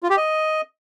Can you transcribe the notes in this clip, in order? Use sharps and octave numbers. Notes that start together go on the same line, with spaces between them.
F4
G4
D#5